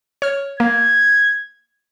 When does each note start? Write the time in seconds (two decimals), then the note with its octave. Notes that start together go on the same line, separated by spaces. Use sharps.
0.22 C#5 F6
0.60 A#3 G#6